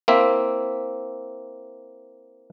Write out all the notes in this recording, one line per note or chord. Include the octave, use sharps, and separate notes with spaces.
A#3 C4 E4 E5